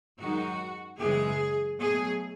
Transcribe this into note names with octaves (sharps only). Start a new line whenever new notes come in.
F#2 D#3 G#3 D#4 F#4
F#2 C#3 E3 G#3 G#4
B2 F#3 A3 G#4